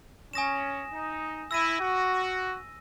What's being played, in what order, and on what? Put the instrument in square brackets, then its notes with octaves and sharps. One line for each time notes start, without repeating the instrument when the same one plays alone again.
[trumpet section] C#4 [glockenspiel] G#5 D#6 A#6 E7
[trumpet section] D#4
[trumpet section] E4 [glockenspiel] E6 A#6 D#7
[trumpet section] F#4